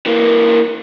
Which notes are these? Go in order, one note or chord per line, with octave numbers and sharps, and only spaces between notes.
E3 A#3